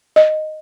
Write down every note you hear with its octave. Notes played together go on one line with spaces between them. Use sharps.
D#5